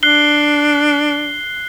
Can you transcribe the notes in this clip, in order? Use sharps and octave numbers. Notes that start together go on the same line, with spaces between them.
D4 F#6 C7 G7